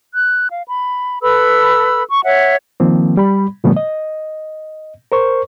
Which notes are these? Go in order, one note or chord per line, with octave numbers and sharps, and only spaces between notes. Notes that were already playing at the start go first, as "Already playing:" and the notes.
F#6
F5
B5
A4 B4 B5 E6
C#6
C#5 E5 F#5
D#3 F3 A#3 C4
G3 B5
A#2 D3 F3 G3 A3 B3
D#5
A#4 C5 C#6